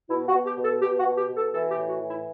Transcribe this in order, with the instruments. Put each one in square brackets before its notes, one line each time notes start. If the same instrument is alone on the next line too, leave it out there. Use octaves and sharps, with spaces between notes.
[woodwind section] B2 E4
F#4
B2
G4
B2
A4
B2 G4
F#4
B2
G4
B2
A4
E3 A4
G4
A2
F#4
E3
E4